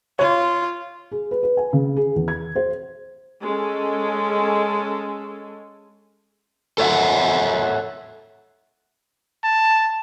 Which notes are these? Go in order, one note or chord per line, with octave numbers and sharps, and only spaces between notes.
F4 C#5
G#4
B4
B4
G#5
C#3
G#4
E2
G#6
C5
G#3 C#4 A4
A4 C#5 E5 F#5
A5